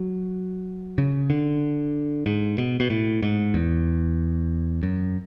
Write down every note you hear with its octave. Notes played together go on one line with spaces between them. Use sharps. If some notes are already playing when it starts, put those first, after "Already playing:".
Already playing: F#3
C#3
D3
G#2
B2
B2
A2
G#2
E2
F#2